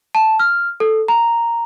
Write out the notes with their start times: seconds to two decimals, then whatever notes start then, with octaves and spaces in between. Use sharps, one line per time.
0.15 A5
0.39 F6
0.80 A4
1.08 A#5